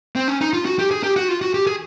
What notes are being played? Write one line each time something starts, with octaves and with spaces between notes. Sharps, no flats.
C4
C#4
D#4
F4
F#4
G4
G#4
G4
F#4
F4
F#4
G4
G#4